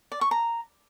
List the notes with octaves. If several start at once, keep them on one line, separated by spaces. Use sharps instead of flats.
D5
C#6
A#5